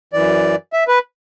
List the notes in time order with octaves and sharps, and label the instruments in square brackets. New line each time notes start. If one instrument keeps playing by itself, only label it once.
[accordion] F#2 E3 D5
E5
B4